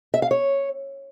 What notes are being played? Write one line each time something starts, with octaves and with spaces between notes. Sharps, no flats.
E5
F5
C#5